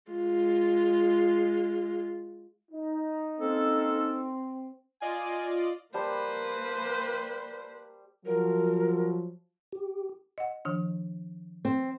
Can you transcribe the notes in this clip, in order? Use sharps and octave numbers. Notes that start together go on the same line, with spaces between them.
G#3 F4
D#4
A#3 C4 C#4 A4
F4 D5 D#5 G#5
G3 A#3 B4 C5 A5
F3 F#3 A#4
G4
D#5 F#5
D#3 F3 D4
C4